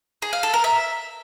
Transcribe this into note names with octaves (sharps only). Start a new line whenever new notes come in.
G#4
F5
A4
A#4
E5